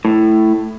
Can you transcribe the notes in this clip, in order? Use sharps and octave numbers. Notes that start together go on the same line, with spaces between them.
A2